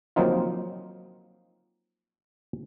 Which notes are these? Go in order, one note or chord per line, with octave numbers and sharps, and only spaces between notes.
F3 F#3 A#3 C4 D#4 F4